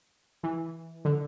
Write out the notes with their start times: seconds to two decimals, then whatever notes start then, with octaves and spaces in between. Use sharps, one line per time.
0.43 E3
1.05 D3